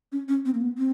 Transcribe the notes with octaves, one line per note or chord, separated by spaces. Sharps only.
C#4
C#4
C4
A#3
B3
C4